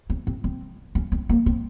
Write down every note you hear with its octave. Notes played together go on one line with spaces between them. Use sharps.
C4
C4
C4
C#4
C4
A#3
C4